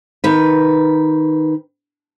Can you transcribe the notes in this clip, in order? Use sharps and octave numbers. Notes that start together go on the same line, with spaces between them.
D#3 B4